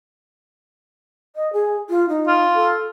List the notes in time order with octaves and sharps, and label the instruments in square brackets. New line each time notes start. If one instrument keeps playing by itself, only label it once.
[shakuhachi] D#5
G#4
F4
D#4
[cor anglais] F4
[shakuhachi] A4